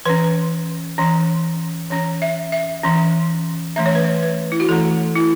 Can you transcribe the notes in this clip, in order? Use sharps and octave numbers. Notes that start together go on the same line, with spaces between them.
E3 C#4 B4
E3 C#4
E3 C#4 C#5
E5
E5
E3 C#4
E3 A3 C#4 E5
C#5
B4
C#5
B4
E4
F#4
E3 A3 C#4 A4
E4